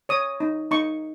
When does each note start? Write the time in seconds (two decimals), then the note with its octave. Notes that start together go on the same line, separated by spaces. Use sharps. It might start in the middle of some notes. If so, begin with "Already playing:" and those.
0.09 C#5 D#6
0.40 D#4
0.71 D#4 C#6